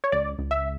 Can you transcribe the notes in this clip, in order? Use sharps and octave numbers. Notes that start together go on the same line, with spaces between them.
C#5
C#2 D5
C#2
E5